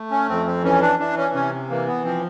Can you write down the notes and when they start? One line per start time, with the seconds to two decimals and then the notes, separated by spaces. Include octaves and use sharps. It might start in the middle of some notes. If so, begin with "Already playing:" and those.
Already playing: A3
0.11 C#4
0.29 F2 C4
0.46 C4
0.64 E3 C#4
0.81 D4
0.99 E3 D4
1.17 C#4
1.34 C3 C#4
1.70 E3 A#3
1.87 B3
2.04 F3 C4